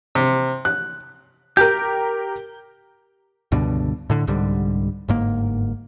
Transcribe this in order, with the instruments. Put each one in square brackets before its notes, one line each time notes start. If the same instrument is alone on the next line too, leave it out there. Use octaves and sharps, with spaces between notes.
[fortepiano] C3
F#6
[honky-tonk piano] G4 A#4 [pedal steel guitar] G6
[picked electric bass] C#2 G2 B2 D3
A2 D3
C2 G#2 D3 G3
G1 G#2 A#3